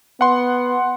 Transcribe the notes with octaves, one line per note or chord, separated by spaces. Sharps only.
B3 F#5 C6